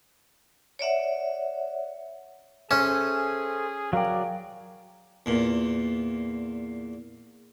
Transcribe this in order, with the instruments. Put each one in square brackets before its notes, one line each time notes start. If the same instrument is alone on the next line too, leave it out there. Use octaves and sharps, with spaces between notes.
[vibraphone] C#5 D5 E5 F#5
[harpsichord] C#4 [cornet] G#4 [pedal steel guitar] A4 C5 E5
[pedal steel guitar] F#3 D5 [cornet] A#4 [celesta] F5 G5
[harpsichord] E2 A#2